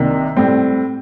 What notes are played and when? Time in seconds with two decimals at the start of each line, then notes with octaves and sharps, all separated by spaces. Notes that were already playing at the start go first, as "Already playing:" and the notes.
Already playing: C2 C3 D#3 A#3 D4
0.37 A2 G3 C4